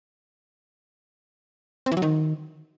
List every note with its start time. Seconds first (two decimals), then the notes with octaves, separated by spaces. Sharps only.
1.86 C4
1.92 E3
1.97 F#3
2.02 D#3